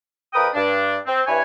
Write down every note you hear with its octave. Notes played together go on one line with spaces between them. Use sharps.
F2 A#4 B4 G5 D#6
G2 D4
C4
G2 E4 B4 C#5 G#5